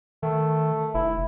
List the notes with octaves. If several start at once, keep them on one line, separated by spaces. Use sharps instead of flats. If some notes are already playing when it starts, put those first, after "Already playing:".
D#3 A3
F1 E4